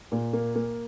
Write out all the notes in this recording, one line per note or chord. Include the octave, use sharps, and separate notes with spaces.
A#2
A#3
A#3